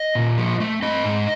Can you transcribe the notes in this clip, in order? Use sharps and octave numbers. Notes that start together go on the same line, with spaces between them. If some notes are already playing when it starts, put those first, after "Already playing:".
Already playing: D#5
A#2
F3
A3
C4 D#5
G#2